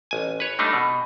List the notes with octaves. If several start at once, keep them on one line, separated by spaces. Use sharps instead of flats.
A1 G#5
B4 C#5
G3 A3 D4 D#4
B2